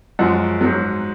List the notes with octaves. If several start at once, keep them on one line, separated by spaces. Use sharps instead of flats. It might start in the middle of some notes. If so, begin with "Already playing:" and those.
F#2 F3 G#3 F#4
G#2 F#3